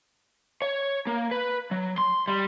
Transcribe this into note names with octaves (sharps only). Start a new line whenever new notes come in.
C#5
A#3
B4
F#3
C6
G3